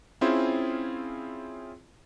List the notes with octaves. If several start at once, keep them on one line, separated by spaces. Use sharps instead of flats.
C4 C#4 E4 F4 G#4 C5